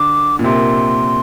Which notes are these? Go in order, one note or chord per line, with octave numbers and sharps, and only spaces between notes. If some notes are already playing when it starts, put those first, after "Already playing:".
Already playing: D3 D6
A#2
C3 C6